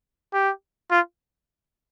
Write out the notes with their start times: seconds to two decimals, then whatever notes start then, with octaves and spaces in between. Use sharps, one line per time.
0.34 G4
0.91 F4